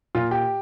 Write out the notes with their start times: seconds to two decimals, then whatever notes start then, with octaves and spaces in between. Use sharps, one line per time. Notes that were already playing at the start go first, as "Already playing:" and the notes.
0.15 A#2 F4
0.31 G4